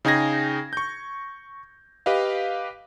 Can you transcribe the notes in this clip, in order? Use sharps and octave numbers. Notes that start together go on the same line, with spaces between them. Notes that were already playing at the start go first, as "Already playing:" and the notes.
C#3 D#4 G#4 G5 G#6 A#6
C#6 G6
G4 B4 D#5 F5